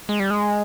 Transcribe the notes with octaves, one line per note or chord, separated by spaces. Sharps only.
G#3
G3
G#3